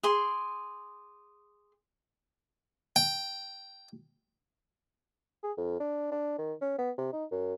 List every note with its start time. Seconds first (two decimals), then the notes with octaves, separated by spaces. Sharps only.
0.03 G#4 C6 D6
2.96 G5
5.43 G#4
5.57 F2
5.80 D4
6.11 D4
6.38 D#3
6.61 C#4
6.78 B3
6.98 C3
7.13 D#4
7.31 F#2